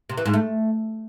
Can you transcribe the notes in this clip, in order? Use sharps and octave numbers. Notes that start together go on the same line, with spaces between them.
C3
E3
G#2
A3